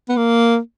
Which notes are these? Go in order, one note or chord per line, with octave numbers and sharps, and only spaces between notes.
B3
A#3